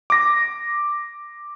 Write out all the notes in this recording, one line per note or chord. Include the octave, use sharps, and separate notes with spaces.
D6 A#6